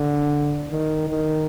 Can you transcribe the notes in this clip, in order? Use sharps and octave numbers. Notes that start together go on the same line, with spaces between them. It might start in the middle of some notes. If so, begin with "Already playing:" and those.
Already playing: D3
D#3
D#3